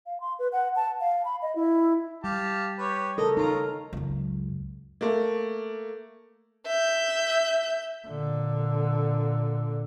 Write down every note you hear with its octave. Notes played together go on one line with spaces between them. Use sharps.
F5
C6
B4
F#5
A5
F5
B5
D#5
E4
G3 G4 F5 A5
G4 B4 C#5
C#3 A4 A#4 D#5
C#4 D#4 F4 A#4
C#2 F#2
A3 A#3
E5 G6
A#2 D3